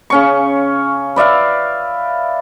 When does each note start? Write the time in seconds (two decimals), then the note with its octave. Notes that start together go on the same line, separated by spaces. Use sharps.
0.10 C#3 C#4 C#6
1.16 B4 D5 E5 F5